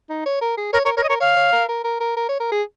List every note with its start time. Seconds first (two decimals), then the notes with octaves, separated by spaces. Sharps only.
0.09 D#4
0.26 C#5
0.41 A#4
0.57 G#4
0.73 A#4 C#5
0.85 A#4 C#5
0.97 A#4 C#5
1.04 D#5
1.09 A#4 C#5
1.20 C#5 F5
1.36 C#5
1.52 A#4
1.68 A#4
1.84 A#4
2.00 A#4
2.16 A#4
2.29 C#5
2.40 A#4
2.52 G#4